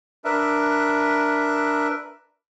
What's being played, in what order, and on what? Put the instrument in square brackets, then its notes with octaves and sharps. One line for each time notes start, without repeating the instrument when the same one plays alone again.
[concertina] D4 A#4 B4 E5